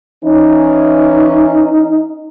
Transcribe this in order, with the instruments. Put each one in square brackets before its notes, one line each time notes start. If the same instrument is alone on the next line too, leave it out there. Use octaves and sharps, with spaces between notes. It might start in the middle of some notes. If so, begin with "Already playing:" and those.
[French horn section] E3 C#4 [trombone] D#4